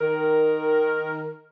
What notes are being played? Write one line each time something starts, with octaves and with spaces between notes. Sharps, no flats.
D#3 A#4